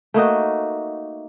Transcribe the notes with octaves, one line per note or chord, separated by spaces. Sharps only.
A3 A#3 D#4 F#4